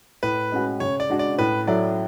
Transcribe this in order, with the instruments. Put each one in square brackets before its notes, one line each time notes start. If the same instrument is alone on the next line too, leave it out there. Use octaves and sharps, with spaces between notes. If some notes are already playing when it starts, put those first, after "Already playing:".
[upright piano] A2 [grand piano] B4
[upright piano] G#3 C#4 F#4
[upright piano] C#3 [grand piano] C#5
[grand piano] D5
[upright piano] G#3 D4 F#4
[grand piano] D5
[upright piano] A2 [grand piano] B4
[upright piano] F#3 A3 E4 [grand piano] D5